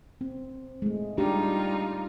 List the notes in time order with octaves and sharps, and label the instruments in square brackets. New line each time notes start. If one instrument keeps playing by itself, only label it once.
[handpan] C4
G#3 A3
[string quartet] G3 D#4 F4 [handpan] G#3 D4 G4